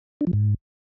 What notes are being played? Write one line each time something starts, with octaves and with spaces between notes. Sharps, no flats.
D4
F3
G#2